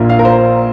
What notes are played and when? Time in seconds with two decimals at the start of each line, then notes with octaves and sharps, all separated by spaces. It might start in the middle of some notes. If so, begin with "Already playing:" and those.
Already playing: A#1 A#2 A#3 D4 F4
0.09 F5
0.19 A#4
0.25 C5